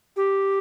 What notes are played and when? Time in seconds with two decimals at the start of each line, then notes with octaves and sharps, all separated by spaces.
0.16 G4